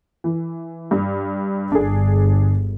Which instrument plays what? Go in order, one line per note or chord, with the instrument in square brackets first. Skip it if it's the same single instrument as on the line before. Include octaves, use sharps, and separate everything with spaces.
[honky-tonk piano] E3
G2
[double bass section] G1 [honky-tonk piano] D4 G#4